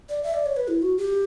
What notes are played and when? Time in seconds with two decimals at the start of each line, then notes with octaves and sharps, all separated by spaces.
0.09 D5
0.23 E5
0.34 D5
0.46 C#5
0.57 B4
0.68 E4
0.82 F#4
0.98 G4